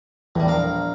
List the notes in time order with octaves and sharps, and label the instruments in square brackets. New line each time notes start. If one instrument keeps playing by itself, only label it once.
[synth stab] E2 [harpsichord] A2 G3
[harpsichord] A#1 A#4 F5